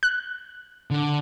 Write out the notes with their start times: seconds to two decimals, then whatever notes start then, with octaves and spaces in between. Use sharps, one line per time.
0.03 F#6
0.91 D3